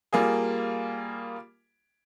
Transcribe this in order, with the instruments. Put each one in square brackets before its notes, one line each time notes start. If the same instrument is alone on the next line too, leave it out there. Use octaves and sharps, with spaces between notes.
[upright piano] G3 A#3 F4 G#4